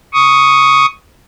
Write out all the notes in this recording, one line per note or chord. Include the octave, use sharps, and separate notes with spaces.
C#6 D#6